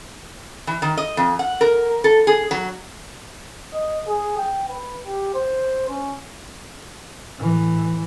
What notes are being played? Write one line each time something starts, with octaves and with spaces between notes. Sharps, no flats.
E3
D#3
D#5
F2
F#5
A#4
A4
G#4
F#3
D#5
G#4
G5
B4
G4
C5
C#4
A2 E3